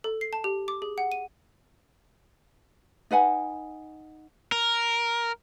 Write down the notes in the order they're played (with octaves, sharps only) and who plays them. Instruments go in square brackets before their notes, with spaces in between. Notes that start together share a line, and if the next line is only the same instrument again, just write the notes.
[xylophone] A4
C7
A5
G4
D6
G#4
F#5
D#7
[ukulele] D#4 B4 F#5 G#5
[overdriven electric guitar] A#4